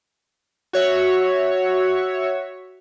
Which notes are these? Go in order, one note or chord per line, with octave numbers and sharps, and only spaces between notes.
F#4 C#5 E5